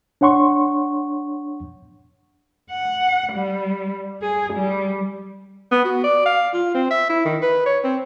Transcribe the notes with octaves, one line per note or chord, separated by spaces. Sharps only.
D4 C#5 F#5 C6 C#6
F#5
G3
G#4
G3
B3
F#4
D5
F5
F4
C4
E5
E4
D#3
B4
C#5
C4